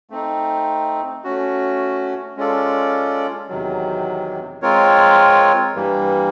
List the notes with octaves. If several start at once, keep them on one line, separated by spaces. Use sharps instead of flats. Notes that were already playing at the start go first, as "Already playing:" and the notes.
A3 C4 D#4
A3 C#4 F#4
G#3 C#4 F4 A4 D5
E2 C3 D#3 F#3
G#3 C4 F4 A#4 C#5
G2 E3 G3 A#3